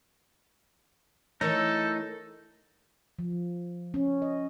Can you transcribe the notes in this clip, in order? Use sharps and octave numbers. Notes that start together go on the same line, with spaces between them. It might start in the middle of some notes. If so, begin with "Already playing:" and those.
E3 A3 D#4 A4 A#4 C#5
F3
C#4
D#5